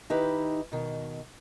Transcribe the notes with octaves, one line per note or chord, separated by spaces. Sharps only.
D#3 D#4 E4 G4 B4
B2 D#3